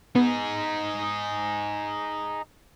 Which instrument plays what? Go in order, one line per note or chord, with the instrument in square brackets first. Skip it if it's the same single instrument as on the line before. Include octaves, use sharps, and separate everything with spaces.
[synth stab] B3 [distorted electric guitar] D#4 G#4